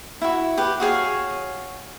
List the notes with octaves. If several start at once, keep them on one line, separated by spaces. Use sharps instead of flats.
E4 F#4
G4 B4
F#4 G#4 C#5 F5